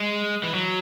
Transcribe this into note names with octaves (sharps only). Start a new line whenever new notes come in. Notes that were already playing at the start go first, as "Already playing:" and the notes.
Already playing: G#3
E3
F#3